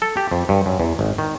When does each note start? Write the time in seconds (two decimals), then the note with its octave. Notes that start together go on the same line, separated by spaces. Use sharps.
0.02 A4
0.17 G4
0.31 F2
0.49 G2
0.66 F#2
0.80 E2
0.99 G#1
1.18 D#3